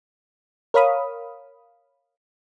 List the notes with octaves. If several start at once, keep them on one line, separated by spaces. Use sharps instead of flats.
A#4 C#5 F5 B5 D#6